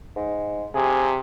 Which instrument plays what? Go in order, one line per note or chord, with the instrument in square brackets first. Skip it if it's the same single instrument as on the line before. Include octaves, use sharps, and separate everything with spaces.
[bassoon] G#2
[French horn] C3 [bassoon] G#4